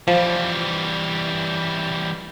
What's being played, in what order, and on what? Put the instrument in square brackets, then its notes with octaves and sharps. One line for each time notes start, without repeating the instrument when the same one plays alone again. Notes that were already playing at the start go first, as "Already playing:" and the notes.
[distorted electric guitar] E3 G3 [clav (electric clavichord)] F3